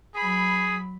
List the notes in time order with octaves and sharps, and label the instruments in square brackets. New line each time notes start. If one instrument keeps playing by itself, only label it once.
[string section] F#3 B5 [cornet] G#4